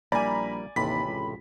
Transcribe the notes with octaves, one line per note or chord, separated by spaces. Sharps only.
A#1 G3 A#3 E4 D5 G#5 A#5 B5
A1 D#2 C3 B5 B6
C#2